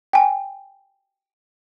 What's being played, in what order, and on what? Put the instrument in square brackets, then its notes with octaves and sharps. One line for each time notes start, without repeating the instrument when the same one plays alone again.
[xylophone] G5 G#5